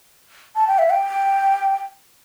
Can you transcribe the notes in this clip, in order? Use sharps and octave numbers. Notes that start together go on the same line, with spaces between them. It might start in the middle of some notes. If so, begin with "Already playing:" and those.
A5
G5
E5
G5